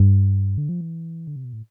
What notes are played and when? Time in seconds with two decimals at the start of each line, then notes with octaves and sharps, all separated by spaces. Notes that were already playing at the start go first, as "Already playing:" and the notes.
Already playing: G2
0.58 D3
0.69 F3
0.81 E3
1.27 D3
1.36 C3
1.45 B2
1.53 A2